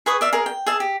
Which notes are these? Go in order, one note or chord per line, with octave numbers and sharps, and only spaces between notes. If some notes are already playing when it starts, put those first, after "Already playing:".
G#4 B4 C#6 D#6
D5 E5 F5
G#4 A#4
G5
G#4 E5 A5
G4